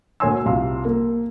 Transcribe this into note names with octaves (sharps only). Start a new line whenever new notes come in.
D2 A#3 C#5 G#5 C6 E6
C2 F3 F5 A5 C6
A#3